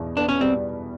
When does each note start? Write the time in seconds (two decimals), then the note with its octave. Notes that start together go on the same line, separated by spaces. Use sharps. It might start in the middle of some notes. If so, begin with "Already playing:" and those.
Already playing: E2 B2
0.17 B3 D4
0.29 C#4
0.41 G3 C4